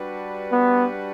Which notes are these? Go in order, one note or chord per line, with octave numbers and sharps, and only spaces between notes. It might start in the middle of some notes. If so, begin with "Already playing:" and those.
Already playing: G3 D4 F#4 B4
B3